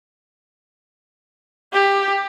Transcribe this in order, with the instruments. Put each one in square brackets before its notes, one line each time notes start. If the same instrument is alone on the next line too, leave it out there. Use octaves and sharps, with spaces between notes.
[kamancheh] G4